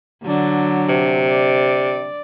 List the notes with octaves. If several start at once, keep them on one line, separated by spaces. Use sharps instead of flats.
D3 F#3 D4
C3
D5